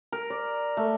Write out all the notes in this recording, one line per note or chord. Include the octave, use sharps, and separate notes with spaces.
A#4
D5
A3